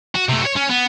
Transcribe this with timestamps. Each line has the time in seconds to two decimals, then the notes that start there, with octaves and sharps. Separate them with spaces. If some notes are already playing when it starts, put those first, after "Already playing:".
0.16 F#4
0.30 C3 A3
0.43 F#4 C#5
0.57 C#4
0.70 B3